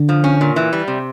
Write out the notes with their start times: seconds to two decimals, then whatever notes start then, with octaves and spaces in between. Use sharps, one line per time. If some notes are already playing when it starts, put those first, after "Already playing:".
Already playing: D3
0.09 F3
0.24 C#4
0.41 A#2
0.56 E3
0.73 G3
0.88 C3